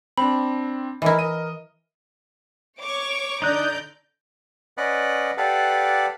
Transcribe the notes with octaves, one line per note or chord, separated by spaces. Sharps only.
C4 D4 B5
E3 D#4 E4 A#4 D#5
A#4 D#5 D#7
C#5 C#6 D6
D3 D#4 D5 A#5 F#6 G6
C#4 B4 D5 D#5 F#5
G4 A4 B4 D5 F5 F#5